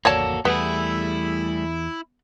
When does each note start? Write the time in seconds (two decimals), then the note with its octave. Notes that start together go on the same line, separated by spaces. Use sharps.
0.05 G#1 E2 A#3 F#4 A4 C#5 D5 A5
0.45 E2 E3 G3 A3 B3 E4 G#4